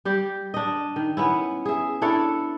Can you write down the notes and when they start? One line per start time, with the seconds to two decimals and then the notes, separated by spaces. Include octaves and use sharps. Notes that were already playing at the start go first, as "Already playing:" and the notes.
0.05 G3 G4
0.54 D4 D#5
0.96 D#3
1.17 B3 C#4 E4
1.65 G#4 E5
2.02 D4 E4 A4 C#5